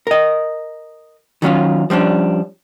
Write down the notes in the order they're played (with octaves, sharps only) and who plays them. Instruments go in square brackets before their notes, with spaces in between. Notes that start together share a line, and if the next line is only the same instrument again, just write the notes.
[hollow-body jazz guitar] A#4 D#5
D#3 F#3 C#4 F4
F3 G3 C#4 D4